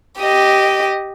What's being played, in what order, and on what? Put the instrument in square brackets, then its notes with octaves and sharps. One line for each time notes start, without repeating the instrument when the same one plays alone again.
[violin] G4 D#5